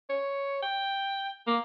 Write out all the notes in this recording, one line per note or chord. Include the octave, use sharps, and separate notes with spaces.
C#5
G5
A#3